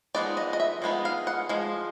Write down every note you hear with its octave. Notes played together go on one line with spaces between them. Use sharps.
F3 G#3 B3 D#4 D5
D#5
D#5
E5
F3 G#3 B3 D#4
F5
F#5
F3 G#3